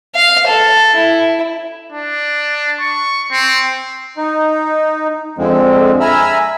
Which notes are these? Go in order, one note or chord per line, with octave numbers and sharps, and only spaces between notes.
F5
A4
E4
D4
C#6
C4
D#4
F2 D3 F3 G#3 C4
E5 G#5 A#5 B5 E6 F6